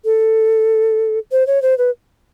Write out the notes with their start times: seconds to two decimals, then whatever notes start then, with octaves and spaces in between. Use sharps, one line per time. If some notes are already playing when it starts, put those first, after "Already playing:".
0.05 A4
1.32 C5
1.47 C#5
1.62 C5
1.78 B4